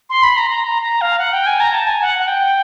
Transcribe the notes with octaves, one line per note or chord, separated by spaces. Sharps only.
C6
B5
A#5
A#5
A#5
A#5
F5
F#5
G5
G#5
A#5
A5
G#5
F#5
F#5
G5